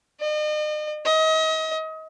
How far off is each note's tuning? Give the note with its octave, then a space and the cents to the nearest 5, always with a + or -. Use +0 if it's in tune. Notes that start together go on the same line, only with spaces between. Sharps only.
D#5 -40
D#5 +35